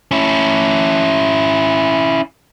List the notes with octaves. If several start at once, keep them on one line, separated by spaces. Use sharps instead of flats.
C#4 E4